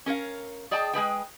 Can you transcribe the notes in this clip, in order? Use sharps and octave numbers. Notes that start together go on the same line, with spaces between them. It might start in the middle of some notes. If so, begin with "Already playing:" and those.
C#4 A#4 C#5 F5
G#4 D5 D#5 G5 A5
G#3 G#4 B4 G5